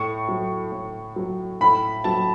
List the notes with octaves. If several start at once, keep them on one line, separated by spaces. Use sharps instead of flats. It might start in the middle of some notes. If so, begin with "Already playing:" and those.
Already playing: A2 C#6
F#3
A2
F#3
A2 B5
F#3 A5